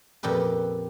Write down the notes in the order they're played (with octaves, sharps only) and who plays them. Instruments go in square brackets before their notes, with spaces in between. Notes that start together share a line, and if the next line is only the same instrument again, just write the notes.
[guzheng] F2 A#2 G4 B4